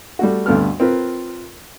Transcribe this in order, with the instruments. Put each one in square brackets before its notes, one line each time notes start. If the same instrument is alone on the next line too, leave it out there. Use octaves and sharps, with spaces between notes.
[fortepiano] G3 A3 F#4
D2 G2 A3 B3 A4 F6
C4 F4 A#4 B4